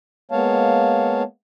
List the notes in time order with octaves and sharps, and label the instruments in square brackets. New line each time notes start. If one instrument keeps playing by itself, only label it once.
[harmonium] G#3 A#3 B3 C#5 F5 A5